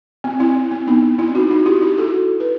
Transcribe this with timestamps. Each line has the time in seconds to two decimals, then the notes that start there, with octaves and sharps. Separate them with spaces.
0.24 C4
0.40 C4 E4
0.71 C4
0.87 B3 D#4
1.19 C4 E4
1.35 D#4 F#4
1.51 D#4 F#4
1.66 E4 G4
1.82 E4 G4
1.98 F#4 A4
2.40 B4